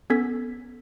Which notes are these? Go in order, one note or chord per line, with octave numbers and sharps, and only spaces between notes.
B3 C#4 A4 G#6 B6